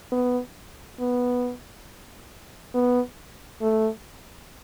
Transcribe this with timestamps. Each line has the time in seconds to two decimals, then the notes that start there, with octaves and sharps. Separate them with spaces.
0.12 B3
0.99 B3
2.74 B3
3.62 A3